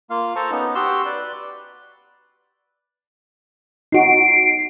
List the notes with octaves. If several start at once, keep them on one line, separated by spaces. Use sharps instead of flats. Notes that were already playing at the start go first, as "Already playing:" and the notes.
A#3 F4 F5
F4 A4 C5 A5 A#5 C#6
B3 C#4 D#4
F#4 G4 C6 E6
B4 D5
D#4 F#4 C7 D7